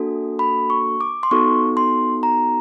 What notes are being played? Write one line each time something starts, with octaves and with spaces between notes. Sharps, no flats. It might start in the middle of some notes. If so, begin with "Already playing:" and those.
Already playing: A#3 D4 F#4 A4
B5
C#6
D6
C6
B3 D#4 F#4 A4 C#6
C6
A#5